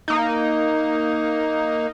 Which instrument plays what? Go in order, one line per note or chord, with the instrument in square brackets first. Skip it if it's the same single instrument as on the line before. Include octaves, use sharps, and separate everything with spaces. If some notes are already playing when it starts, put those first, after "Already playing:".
[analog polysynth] A#3 D#4